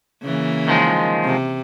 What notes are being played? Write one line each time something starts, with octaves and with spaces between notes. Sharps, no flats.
C#3 E3 A#3
D#3 F3 G#3
C3